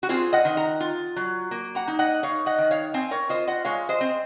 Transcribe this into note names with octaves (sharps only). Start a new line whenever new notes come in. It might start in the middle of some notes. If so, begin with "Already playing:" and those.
F#4
C4 F4 G#4
D#5 F#5
D#3
F#5 A#5
F4
F#3
A#3
F#5 A#5
D#4
D#5 F#5
D#4 C#5 F5
D#5 F#5
D#3
C#5 F5
C4 F5 G#5
A#4 C#5
F4 C5 D#5
D#5 F#5
G#3 C#5 F5
C5 D#5
C4